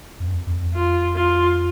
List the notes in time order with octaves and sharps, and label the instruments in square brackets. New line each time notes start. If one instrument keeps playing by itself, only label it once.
[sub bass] F2
F#2
F2
F2
[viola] F4
F4